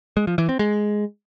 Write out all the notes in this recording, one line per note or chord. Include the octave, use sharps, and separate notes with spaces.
G#3
F3
E3
C4
G#3